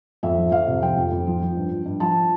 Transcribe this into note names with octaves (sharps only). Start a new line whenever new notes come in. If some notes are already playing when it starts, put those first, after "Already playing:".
F2 E5
F3
F2 F5
C3
F3 G5
F2
F2
F3
F3
G2
G2
G2
F3 A5